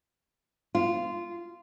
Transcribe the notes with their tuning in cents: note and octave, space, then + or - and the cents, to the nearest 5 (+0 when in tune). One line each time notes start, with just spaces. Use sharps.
F4 -15